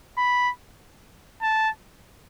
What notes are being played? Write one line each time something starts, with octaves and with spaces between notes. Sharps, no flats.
B5
A5